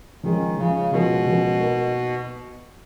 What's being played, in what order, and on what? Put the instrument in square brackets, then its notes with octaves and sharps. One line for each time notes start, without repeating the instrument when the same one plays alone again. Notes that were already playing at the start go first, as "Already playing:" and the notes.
[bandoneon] D#3 [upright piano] F3 G#3 C#4
[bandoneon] C#3 [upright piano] F3 G#3 C#4
[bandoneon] C#3
[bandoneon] B2 [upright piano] F3 G#3 C#4 F4 A#4
[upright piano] F3 G#3 C#4 F4 A#4
A#3 D#4 A#4